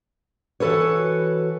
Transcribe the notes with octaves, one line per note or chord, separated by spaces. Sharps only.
E3 F#4 A4 B4 C#5